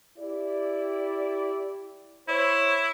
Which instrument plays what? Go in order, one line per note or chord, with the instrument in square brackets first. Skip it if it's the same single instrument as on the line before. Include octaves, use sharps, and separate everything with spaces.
[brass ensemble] E4 G4 D5
[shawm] E4 [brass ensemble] C5 C#5